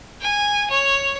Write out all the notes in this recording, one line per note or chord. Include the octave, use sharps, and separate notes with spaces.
G#5
C#5